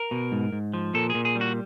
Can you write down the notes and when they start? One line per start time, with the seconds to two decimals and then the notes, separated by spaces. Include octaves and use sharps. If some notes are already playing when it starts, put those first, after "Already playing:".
Already playing: A#4
0.11 B2
0.32 G#2
0.53 G#2
0.74 F3
0.94 A#2 A4
1.10 A#2 G#4
1.25 G#4
1.35 G3
1.41 F#4